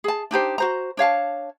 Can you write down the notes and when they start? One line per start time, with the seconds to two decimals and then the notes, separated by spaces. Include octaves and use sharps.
0.04 G#4 A5
0.31 D4 D#4 G4 C5
0.58 F#4 C5 A#5
0.97 D4 C#5 F5 A5